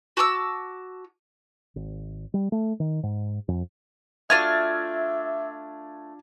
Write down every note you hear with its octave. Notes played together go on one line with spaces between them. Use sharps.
F#4 A5 D6 E6
G#1
G3
A3
D#3
G#2
F2
A3 D4 F4 F#4 E5 F6 G#6 A6